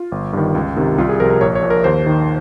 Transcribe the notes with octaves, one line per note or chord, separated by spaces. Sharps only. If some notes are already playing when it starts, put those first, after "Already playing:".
Already playing: F4
G1
G2 D#3
C#2
C3 D#3
C2 F4
G#4
C3 F3 A#4
A#4
A#1 C#5
C#5
A#2 F3
A#4
D#2 C5
D#3